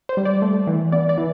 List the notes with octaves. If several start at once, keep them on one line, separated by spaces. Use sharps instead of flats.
C5
G3
D5
A3
E3
B3 D5
D5
E3